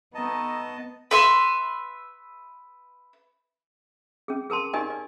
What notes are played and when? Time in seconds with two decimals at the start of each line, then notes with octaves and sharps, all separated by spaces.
0.15 A3 B3 D#4 D#5 A5
1.11 B4 E5 C6
4.28 C#4 G#4
4.50 G#4 A#4 A5 C6
4.73 D#4 G4 A#4 D5 D#5 G#5
4.90 D5